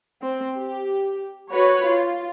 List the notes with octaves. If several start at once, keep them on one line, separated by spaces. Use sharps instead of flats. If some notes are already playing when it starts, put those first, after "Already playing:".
C4
G4
F#4 B4 C#5
F4